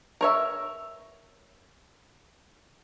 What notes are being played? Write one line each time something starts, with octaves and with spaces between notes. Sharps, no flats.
A#4 C#5 E5